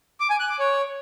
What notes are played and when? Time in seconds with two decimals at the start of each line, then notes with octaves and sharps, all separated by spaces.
0.20 D6
0.30 G#5
0.40 F#6
0.50 D6
0.59 C#5